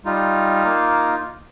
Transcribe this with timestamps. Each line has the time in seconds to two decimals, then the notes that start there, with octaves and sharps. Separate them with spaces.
0.05 G3 D#4 F4
0.65 A#3